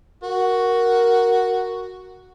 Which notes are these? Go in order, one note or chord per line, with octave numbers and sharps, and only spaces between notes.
F#4 A#4